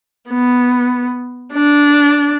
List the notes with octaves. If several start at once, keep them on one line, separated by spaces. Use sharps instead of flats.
B3
D4